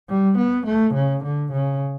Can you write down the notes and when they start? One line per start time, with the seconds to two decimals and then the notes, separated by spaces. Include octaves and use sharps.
0.09 G3
0.38 B3
0.66 A3
0.94 C#3
1.24 D3
1.52 C#3